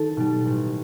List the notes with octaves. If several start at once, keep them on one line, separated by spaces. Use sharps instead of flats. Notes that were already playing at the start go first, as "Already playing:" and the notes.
Already playing: D#3 A4
B2 G3
A1